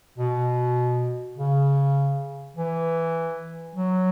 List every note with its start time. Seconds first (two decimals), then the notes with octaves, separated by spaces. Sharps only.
0.18 B2
1.38 C#3
2.56 E3
3.75 F#3